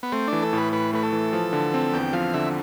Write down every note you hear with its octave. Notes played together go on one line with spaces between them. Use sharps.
B3
A3 C4
E3 D4
A4
A2 B4
A2 B4
A3 B4
A4
E3
F3
D3
C4
E2 G5
F3 F5
D3 E5